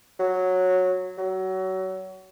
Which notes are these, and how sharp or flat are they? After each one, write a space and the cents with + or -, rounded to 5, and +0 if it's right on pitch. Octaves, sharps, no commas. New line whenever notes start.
F#3 -10
F#3 +25